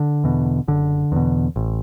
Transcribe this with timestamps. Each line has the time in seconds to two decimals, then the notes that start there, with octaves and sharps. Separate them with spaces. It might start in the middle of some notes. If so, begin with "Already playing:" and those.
Already playing: D3
0.24 E2 B2
0.68 F#1 D3
1.12 E2 B2
1.56 A1